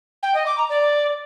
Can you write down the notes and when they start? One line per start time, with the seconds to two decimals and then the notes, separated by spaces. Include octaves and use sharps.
0.23 G5
0.34 D#5
0.46 D6
0.58 A#5
0.69 D5